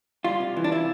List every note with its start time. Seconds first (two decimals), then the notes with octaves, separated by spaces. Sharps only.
0.24 G3 F4
0.40 C3
0.56 E3
0.64 D4
0.71 C3 E4